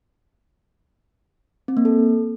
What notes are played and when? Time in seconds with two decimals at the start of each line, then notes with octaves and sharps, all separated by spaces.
1.68 C4
1.77 A#3
1.85 A4